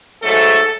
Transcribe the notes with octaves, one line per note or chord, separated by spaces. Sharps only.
G#2 F#3 A3 A4